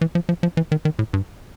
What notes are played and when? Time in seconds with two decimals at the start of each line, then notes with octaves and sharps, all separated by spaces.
0.01 E3
0.15 F3
0.29 F3
0.43 F3
0.57 E3
0.72 D#3
0.85 D#3
0.99 A2
1.13 G2